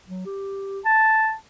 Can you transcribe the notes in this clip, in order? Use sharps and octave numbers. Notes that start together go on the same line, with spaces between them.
F#3
G4
A5